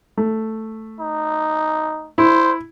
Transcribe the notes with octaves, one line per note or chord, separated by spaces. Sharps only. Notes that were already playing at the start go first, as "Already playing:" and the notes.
A3
D#4
E4 C5